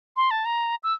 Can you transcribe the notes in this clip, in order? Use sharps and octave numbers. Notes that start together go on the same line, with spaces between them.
C6
A5
A#5
E6